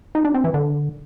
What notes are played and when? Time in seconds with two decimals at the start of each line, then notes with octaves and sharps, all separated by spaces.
0.15 D#4
0.25 D4
0.34 C4
0.44 E3
0.54 D3